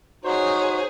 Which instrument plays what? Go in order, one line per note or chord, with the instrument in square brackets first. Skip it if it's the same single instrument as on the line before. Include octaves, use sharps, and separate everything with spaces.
[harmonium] D#4 F#4 [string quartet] G#4 C#5 [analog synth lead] C5